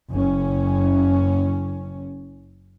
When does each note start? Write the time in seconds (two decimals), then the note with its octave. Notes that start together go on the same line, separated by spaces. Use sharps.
0.11 F#1 C#4